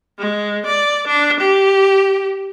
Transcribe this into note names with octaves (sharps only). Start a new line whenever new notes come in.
G#3
D5
D4
G4